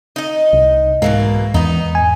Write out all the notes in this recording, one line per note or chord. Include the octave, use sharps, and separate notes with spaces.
D#4 D#5
C2
G#2 B2 E3 A#3
E2 B3 D#4
G#5